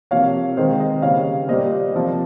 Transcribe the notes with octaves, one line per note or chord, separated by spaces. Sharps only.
C3 F3 A#3 C#5 F5
C3 D#3 G#3 C5 D#5
C5 D#5
C#3 G3 A#3 C#5 F5
A#2 G3 A#3 C5 D#5
C3 F3 A#3 C5